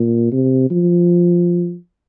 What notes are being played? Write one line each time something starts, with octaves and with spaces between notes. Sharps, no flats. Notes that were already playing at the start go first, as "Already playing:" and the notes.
Already playing: A#2
C3
F3